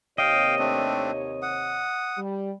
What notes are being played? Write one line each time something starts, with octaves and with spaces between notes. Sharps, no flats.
D#2 C3 C#5 D#5 F5 G5
A3 C4 D4
F#5 D#6
G3